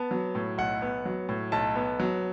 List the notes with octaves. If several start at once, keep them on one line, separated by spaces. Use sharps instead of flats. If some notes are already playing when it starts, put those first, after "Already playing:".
Already playing: B3 A5
F#3
A2
B1 F#5
B3
F#3
A2
B1 A5
B3
F#3